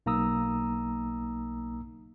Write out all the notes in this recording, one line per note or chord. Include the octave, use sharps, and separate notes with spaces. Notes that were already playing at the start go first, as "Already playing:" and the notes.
B1 A#3 D#4 A#5 D#6 E6